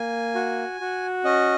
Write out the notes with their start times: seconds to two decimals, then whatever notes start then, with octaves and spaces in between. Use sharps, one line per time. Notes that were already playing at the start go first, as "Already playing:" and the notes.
Already playing: A#3 G#5
0.35 F#4
0.80 F#4
1.24 C#4 D#5